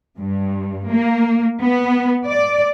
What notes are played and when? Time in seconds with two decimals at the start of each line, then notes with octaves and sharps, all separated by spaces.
0.19 G2
0.89 A#3
1.62 B3
2.27 D5